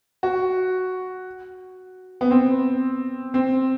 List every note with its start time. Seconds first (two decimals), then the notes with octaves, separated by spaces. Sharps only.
0.23 F#4
2.21 B3
2.31 C4
3.34 C4